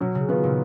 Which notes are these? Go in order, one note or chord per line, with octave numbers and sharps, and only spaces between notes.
B2 F#3
C#3
D#3 B3 F4
A#2